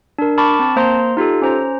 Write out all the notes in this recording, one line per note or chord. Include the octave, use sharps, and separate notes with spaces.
D4 A#4
A5 B5 C#6 D6 F6 A6
C4 A5
A#3 C5 A#5 C6
D#4 F4 G4 A4
C#4 C5 A#5